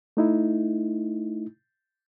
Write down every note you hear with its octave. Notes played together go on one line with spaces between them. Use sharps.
A3 D#4 E4